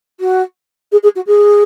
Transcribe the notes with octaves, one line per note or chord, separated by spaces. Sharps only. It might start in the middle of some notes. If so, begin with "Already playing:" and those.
F#4
G#4
G#4
F#4
G#4